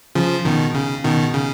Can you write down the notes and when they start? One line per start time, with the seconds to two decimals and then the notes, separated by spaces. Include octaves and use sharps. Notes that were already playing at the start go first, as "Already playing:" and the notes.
0.15 C#3 F3
0.45 B2 D#3
0.74 C#3
1.04 B2 D#3
1.34 C#3